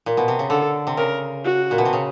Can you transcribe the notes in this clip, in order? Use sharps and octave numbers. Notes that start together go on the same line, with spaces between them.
A#2
B2
C3
C#3
D3 A4
C3
C#3 A#4
F#4
A#2
B2
C3
C#3